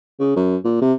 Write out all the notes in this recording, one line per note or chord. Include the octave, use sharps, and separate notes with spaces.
C#3
F#2
A#2
C3